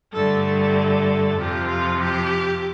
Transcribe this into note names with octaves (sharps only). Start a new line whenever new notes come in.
G2 D3 A3 A4
A4
F2 C3 F3 G4
F4
G4